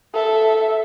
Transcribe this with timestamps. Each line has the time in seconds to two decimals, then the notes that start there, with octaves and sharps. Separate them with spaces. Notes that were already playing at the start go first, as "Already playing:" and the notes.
0.14 A4 E5